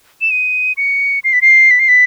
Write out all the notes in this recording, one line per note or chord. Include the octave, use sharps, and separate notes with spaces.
E7
D#7
C#7
C7
B6
C7
B6
C7
B6